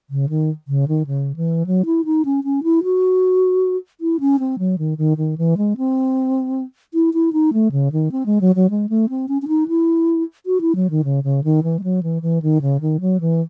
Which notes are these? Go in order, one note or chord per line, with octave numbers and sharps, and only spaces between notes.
C#3
D#3
C#3
D#3
C#3
E3
F#3
E4
D#4
C#4
C#4
E4
F#4
E4
C#4
C4
F#3
D#3
D#3
D#3
E3
G#3
C4
E4
E4
D#4
A3
C#3
D#3
C4
G#3
F#3
F#3
G#3
A3
C4
C#4
C#4
D#4
E4
F#4
E4
F#3
D#3
C#3
C#3
D#3
E3
G#3
F#3
E3
E3
D#3
C#3
D#3
F#3
E3